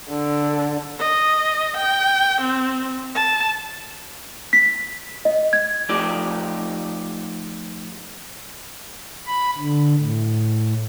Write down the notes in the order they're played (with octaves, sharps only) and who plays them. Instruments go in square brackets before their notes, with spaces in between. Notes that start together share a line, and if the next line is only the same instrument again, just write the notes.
[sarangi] D3
[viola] D#5
G5
C4
A5
[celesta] B6
D#5
G#6
[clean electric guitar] F3 A3 D#4 G4 D5
[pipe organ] B5
D3
A2